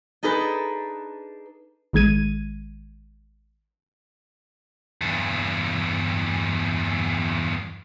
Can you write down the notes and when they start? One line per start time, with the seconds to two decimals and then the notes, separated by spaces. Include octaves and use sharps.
0.23 D4 D#4 G#4 A4 B4
1.93 A1 D#3 G#3 G#6 D#7
5.01 E2 G2